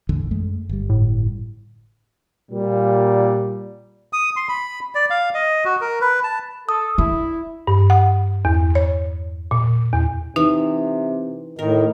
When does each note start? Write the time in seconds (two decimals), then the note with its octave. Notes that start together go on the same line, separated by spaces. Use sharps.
0.09 A1 E2 D3
0.31 F#2 G#3 A3
0.69 G1 G3
0.89 A2
2.52 A#2 G3
4.13 D#6
4.36 C6
4.49 B5
4.95 D5
5.10 F5
5.34 D#5
5.65 F#4
5.81 A#4
6.01 B4
6.24 A5
6.69 A4 D#6
6.98 D4 E4
7.67 G2
7.90 F#5
8.45 E2
8.75 C#5
9.51 A#2
9.93 E2
10.36 C3 E3 D#4
11.59 A2 D#3 A#4